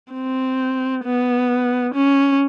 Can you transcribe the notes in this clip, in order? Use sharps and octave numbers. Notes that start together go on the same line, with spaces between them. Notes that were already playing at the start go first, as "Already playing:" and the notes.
C4
B3
C#4